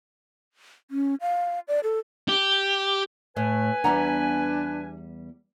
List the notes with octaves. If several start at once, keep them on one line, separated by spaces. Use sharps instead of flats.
C#4
F5
D5
A4
G4
A2 B4 G#5
E2 G3 B3 D4 F#5 A#5